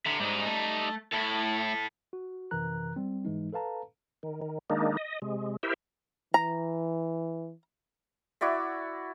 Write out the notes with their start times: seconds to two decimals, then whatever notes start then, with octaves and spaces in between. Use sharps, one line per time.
0.06 D3 E5 A#5
0.20 G#2 G3 D#4
0.46 A3
1.12 A2 E4 A4
2.13 F#4
2.51 F#2 C3 E3 A#4 A#5 F#6
2.96 G3 C4
3.25 G#2 E3 G#3 D#4
3.53 A4 B4 F5 A5 A#5
4.23 D#3
4.41 D#3
4.70 D#3 G#3 A#3 D4 D#4
4.97 D#5
5.22 C3 G#3
5.63 E4 G4 A#4 C5 E5
6.34 E3 A#5
8.41 E4 F#4 D5 E5